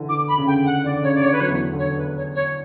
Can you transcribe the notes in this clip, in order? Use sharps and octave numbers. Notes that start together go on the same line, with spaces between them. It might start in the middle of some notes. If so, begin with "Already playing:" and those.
Already playing: D3 E3
D6
B5
C#3
D3 G5
C#3 F#5
D3 D5
C#3 C#5
D5
D3 C#5
B4
F#3 C#5
E2 E3
D3
C#5
B4
C#5
C#5